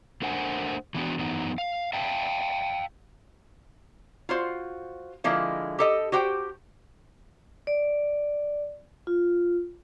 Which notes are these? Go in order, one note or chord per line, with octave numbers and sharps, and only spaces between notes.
A3 D4 A#4 C5 F#5 G#5
E3 B3 D4 F#4
F#2 E3 B3 D#4
F5
E5 F5 G5 A5
F4 F#4 C5
D3 F3 G#3 A#3 E4
G4 A4 D#5
F#4 G4 C5 G5
D5
F4